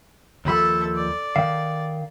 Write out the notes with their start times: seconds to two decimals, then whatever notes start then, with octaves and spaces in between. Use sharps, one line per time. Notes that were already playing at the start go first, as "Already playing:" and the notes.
0.45 D#2 F3 A4 E5 B5
0.95 D5
1.36 D#3 F5